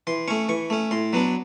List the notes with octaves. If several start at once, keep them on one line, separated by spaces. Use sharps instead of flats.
E3 C6
A3 C#4 C#6
E3 C#6
A3 C#4
A2 C6
F#3 B3 D4